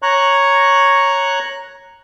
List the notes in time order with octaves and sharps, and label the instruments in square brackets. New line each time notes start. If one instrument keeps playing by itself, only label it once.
[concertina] C#5 A#5 C#6 F#6